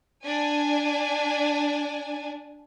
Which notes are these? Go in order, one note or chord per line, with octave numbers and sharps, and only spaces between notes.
D4 G#5